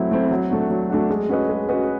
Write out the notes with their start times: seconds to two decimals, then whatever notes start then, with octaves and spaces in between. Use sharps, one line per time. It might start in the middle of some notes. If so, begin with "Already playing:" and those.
Already playing: F#3 A3 C4 E4
0.11 A3 C4 E4
0.31 F#3
0.51 A3 D4 F#4
0.71 F#3
0.90 A3 D4 F#4
1.10 G#3
1.29 C#4 F#4 B4 D#5
1.49 G#3
1.69 C#4 F#4 B4 D#5